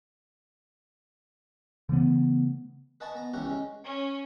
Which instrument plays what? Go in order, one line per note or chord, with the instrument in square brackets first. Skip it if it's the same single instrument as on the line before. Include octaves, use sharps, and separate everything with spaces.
[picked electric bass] C#3 E3 A3 B3
[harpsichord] B4 D#5 F#5 G#5 A5 C#6
B3 A#5
C#2 E3 C#4 G4 F#5 A#5
G#3 C#4
[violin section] C#4